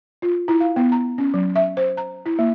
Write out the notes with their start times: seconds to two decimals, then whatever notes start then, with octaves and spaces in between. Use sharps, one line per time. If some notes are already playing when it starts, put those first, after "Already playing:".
0.22 F4
0.48 E4
0.60 F5
0.76 B3
0.92 A#5
1.18 C#4
1.34 F#3
1.56 E5
1.77 C5
1.97 A#5
2.26 E4
2.39 A#3